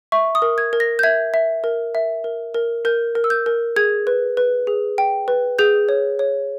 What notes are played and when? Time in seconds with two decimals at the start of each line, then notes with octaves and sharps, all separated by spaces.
0.12 E5 C#6
0.35 D#6
0.42 A#4
0.58 G#6
0.73 A#4
0.80 A#6
0.99 G6
1.03 E5 G#6
1.34 E5
1.64 A#4
1.95 E5
2.24 A#4
2.54 A#4
2.85 A#4 G6
3.15 A#4
3.24 E6
3.30 G6
3.46 A#4
3.76 G#4 G#6
4.07 B4
4.37 B4
4.67 G#4
4.98 G5
5.28 B4
5.59 G#4 G6
5.89 C#5
6.19 C#5